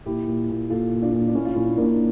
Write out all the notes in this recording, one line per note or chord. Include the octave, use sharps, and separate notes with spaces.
A#2 E4 G4
A#2
A#2
A#2 F4 A4
A#2
D4 F4
A#2
D4
A#2 C#4 E4
F4
A#2 C#4 E4
A#2 A#3 D4